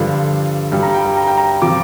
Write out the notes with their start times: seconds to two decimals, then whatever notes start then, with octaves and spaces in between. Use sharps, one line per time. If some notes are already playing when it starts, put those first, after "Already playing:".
Already playing: G2 D3 F3
0.72 G2 G3
0.83 A#5
0.94 G5
1.05 G5
1.17 A#5
1.27 G5
1.37 A#5
1.62 C3 F3 D6